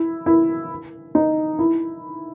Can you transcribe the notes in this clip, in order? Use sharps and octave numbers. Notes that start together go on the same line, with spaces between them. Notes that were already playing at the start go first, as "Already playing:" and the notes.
Already playing: E4
E4
D#4
E4